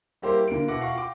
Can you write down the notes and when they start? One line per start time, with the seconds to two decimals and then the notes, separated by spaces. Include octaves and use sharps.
0.22 G3 A#3 E4 G4 A#4 C5
0.48 D3 F4 A#4 D7
0.68 B2 E4 F#5 D6 A#6
0.81 F5 F#5 C#6
0.93 F4 G5 D6